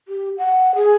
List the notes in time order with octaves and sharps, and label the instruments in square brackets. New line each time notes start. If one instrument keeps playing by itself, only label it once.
[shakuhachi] G4
F#5
G#4